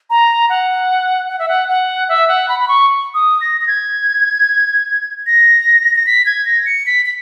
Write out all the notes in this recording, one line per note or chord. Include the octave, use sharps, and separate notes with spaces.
A#5
F#5
F#5
E5
F#5
F#5
E5
F#5
B5
B5
C#6
D#6
A#6
A#6
G#6
A#6
A#6
B6
G#6
A#6
C#7
B6
B6